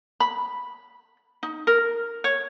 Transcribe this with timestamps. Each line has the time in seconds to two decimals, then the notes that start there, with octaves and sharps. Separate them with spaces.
0.20 B5
1.43 D#4
1.67 A#4
2.24 C#5